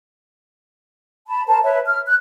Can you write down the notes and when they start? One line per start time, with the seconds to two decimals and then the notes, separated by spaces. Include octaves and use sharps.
1.27 A5 B5
1.47 A#4 C5 A5
1.63 B4 C#5 E5
1.86 F6
2.06 F#6